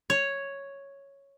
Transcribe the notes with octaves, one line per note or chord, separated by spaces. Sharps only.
C#5